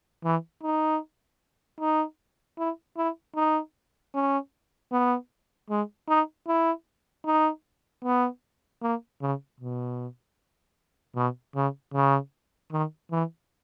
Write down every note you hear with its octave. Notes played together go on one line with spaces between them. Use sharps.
E3
D#4
D#4
E4
E4
D#4
C#4
B3
G#3
D#4
E4
D#4
B3
A#3
C#3
B2
B2
C#3
C#3
D#3
E3